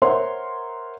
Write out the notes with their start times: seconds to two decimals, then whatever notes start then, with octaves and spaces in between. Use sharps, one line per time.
0.02 A#4 C5 C#5 E5 F#5 C6